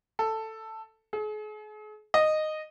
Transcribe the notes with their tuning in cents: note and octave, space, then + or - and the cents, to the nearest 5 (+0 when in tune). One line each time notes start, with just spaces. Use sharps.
A4 +5
G#4 +40
D#5 -10